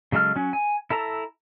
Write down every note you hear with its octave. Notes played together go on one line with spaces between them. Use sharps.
C#3 F#3 G#3 A4 F6
F#3 C#4
G#5
E4 A4 A5 A#5